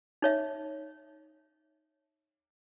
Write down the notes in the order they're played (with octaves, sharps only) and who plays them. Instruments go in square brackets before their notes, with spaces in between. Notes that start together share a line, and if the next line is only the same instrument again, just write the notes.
[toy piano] D#4 C#5 E5